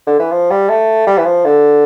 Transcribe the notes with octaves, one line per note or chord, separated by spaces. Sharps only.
D3
E3
F3
G3
A3
G3
E3
F3
D3